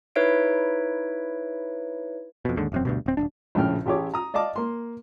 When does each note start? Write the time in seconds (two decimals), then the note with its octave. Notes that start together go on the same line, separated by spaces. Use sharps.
0.16 D#4 E4 B4 C#5 E5 D7
2.45 F2 B2
2.57 D#2 G#2 D3
2.72 E1 F#2 C4
2.85 D2 G2 B2
3.06 D1 C4
3.17 D#1 C#2 D4
3.55 A#1 A2 C#3 G5 F6
3.86 A1 E4 G4 G#4 C#5 D6
4.14 A#5 D#6
4.34 D5 D#5 F5 A5 D6
4.56 A#3 C6